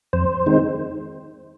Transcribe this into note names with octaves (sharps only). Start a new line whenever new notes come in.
F2 C5
D#3 G#3 C4 D#4